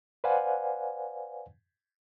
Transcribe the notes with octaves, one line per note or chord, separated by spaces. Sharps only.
B4 C5 D5 F5 F#5 G#5